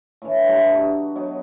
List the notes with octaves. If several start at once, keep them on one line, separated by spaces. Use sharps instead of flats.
A2 D3 E3
G2 G3 B4 E5
D4 D#4 F#4
B2 F#3 B3 D#4